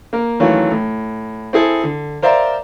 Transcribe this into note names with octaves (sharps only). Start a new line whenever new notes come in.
A#3 A#4
D#3 E3 F#3 A3 C#4 F4
A2
C4 E4 G#4 A4
D3
A#4 C5 D5 E5 F5 A#5